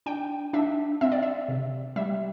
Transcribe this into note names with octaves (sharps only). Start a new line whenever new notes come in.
D4 G5
D4 E5
C4 E5
D5
E5
C3
G3 E5